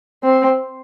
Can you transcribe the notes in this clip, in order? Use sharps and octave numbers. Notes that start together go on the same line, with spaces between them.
C4